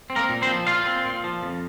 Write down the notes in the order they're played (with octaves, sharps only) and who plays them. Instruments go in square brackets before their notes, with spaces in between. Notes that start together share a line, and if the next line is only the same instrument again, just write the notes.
[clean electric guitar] C4
A#3 A#4
A#2
C4 C5
F3
A#2 F4 F5
C4
A#2
F3
F2